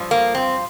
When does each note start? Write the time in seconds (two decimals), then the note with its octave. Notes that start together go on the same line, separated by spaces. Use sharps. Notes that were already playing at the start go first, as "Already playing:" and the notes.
Already playing: G2 F3
0.11 A#3
0.35 C4